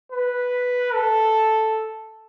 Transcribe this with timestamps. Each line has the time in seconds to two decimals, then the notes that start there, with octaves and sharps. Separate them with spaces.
0.12 B4
0.94 A4